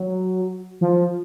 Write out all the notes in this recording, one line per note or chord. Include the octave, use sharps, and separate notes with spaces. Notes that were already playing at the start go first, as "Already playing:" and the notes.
Already playing: F#3
F3